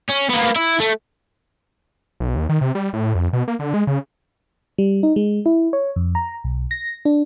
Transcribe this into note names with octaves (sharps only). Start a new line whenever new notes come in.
C#4
A#3 B3
E4
A3
B1
D#2
D#3
C3
G3
A2
F2
B2
A#3
D3
G#3
C#3
G3
D#4
G#3
E4
C#5
F2
A#5
B1
A#6
D4